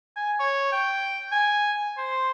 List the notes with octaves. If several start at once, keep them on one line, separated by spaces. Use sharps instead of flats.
G#5
C#5
G5
G#5
C5